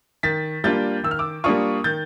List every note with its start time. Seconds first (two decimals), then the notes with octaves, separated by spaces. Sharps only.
0.23 D#3 A6 B6
0.64 G3 A#3 D4 F4 G6 A6
1.04 D#3 E6
1.11 F6
1.19 D6 E6
1.44 G3 A#3 D4 F4 C#6 D#6
1.84 D#3 G6 A6